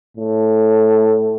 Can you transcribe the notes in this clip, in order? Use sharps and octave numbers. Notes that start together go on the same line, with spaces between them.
A2